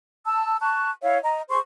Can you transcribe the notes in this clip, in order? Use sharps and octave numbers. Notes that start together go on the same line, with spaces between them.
A5 E6
A5 C#6 F#6
E4 C#5 E5 F5
D#5 A#5
G#4 C5 C6 C#6